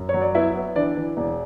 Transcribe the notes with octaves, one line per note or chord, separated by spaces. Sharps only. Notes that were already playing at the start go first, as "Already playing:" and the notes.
Already playing: F#2
C#5
F#3
D5
B3 E4 E5
B3
E3 D4 D5
E3
E1